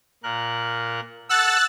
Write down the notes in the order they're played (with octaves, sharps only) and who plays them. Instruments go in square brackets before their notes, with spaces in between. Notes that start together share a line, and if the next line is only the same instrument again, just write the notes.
[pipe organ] A#2 A#4 F#6
[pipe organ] A4 F#5 [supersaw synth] E6 F#6 A6